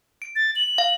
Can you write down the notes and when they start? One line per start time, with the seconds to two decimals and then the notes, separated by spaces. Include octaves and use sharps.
0.22 D7
0.36 A6
0.56 F#7
0.78 F5